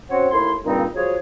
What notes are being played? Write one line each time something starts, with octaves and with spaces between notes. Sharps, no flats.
C4 C#4 F#4 C5 C#5 F#5
D#2 A3 E4 C6
G2 A#2 C#3 G3 C4 D#4
F3 G3 F4 F#4 G#4 C#5